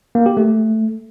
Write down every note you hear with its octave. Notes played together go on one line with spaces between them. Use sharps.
A#3
G4
A3